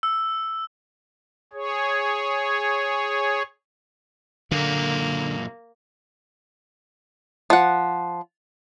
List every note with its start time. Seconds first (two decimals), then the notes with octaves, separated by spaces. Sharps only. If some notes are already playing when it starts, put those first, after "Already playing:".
0.03 E6
1.53 G#4 C#5
4.51 F#2 A#2 D3 A#3
7.50 F3 F#5